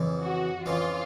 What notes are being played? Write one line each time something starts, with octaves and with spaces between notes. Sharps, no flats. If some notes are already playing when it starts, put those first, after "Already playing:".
Already playing: F2 C#3 E3
F#4
F2 C#3 E3 F4